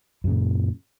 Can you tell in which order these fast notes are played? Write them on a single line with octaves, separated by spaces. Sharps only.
F#2 C#3 A#2